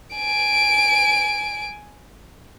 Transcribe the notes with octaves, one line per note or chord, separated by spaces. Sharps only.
G#5 D7